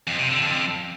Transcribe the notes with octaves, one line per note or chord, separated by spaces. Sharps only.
F2
C3
D3
F2